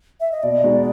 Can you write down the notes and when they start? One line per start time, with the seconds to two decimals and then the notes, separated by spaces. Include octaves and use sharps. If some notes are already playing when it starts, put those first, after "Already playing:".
0.20 E5
0.32 D#5
0.43 B2 D5
0.64 G#3 B3 D#4 F#4